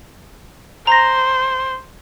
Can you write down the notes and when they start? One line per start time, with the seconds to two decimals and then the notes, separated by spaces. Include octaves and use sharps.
0.87 C5 A#5 A#6